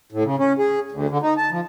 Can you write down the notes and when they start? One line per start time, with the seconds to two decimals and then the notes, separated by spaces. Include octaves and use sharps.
0.12 A2
0.24 C#3
0.39 C#4
0.59 G#4
0.92 D2
1.10 D3
1.22 D#4
1.37 A5
1.51 F3